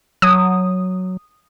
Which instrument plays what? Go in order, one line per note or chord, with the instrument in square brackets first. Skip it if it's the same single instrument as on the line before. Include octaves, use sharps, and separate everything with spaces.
[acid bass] F#3 [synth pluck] D#6